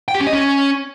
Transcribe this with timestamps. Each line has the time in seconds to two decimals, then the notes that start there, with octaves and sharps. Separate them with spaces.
0.08 G5
0.14 G4
0.21 C#4
0.27 D#5
0.33 C#4